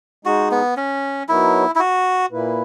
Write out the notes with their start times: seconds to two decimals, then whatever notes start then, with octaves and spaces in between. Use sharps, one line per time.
0.25 G#3 D#4 F#4 G#4
0.51 B3
0.77 C#4
1.28 F#3 B3 D#4 E4 A#4 C#5
1.75 E4
1.79 F#4
2.31 A#2 A#3 E4 B4